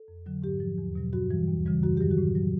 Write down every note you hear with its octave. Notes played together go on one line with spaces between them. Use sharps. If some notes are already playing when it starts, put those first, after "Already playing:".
Already playing: A4
F2
D3 F#3
G#2 G4
F3
E2
B2 F#3
G2 F#4
E3 G3
D#2
C#3 E3 G3
F#2 F#4
D#3 F#3 G4
F#4
A2
F#3